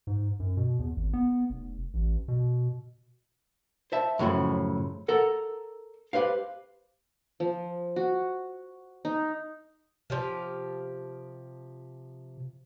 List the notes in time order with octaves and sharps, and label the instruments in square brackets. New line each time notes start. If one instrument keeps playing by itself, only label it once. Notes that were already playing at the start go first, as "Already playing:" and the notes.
[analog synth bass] G#2
F#2
B2
E2
G#1
B3
F1
A1
B2
[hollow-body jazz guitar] C5 E5 A5
F#2 A2 C#3 E3 F3
A4 A#4 F#5
G4 B4 C5 F5
[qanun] F3
F#4
D#4
[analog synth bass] C3 [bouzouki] F3 G4 F5